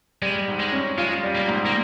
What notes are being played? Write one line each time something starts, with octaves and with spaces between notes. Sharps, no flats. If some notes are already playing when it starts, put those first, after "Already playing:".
G3 G#3
G#2
G#3
C#4
G#3 F4
G3
A#3
G#2
A#3